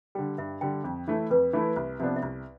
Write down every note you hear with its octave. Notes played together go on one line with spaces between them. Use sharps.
D3 G3 G5
G2 E5
D3 G3 G5
F2
E3 A3 E4
F2 B4
E3 A3 E4
C2
C3 F3 B3 D4
E5
C2 D5